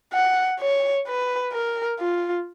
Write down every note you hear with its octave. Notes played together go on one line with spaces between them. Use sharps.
F#5
C#5
B4
A#4
F4